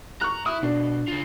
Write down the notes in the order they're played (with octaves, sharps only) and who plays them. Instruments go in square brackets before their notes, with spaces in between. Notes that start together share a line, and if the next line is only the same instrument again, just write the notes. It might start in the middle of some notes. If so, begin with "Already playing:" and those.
[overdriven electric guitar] A#5 [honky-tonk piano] C#6 F#6
[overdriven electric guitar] E4 [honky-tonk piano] D#6
[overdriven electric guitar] B2 [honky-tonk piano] D4
[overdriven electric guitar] C#3 F4